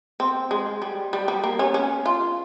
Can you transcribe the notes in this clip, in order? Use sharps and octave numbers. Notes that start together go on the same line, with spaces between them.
C4
G#3
G3
G3
G3
A#3
C#4
C#4
F4